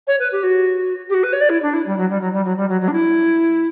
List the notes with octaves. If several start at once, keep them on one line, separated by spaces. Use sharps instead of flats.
C#5
B4
G4
F#4
G4
F#4
B4
C#5
D5
E4
D4
E4
G3
F#3
G3
F#3
G3
F#3
G3
F#3
F#3
D4
E4